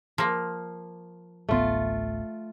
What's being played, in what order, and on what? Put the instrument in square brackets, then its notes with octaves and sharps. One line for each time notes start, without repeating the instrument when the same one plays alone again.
[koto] F3 A#3
[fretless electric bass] D1 A1 B3 [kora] A3 F4